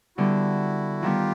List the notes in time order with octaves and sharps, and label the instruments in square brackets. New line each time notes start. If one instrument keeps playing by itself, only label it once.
[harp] D3 G3 B3 [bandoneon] E4 F#4
[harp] D#3 G3 B3 [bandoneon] F4 G4